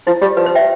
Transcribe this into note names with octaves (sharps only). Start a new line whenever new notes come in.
F3 E4
G3 G4
F3 B4
C5
E5 G5